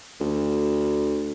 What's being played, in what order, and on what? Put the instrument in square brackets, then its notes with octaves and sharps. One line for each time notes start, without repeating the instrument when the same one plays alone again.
[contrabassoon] D2